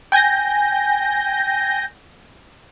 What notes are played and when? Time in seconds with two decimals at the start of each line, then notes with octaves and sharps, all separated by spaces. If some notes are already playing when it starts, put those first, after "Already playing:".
0.12 G5 G#5 G6 A#6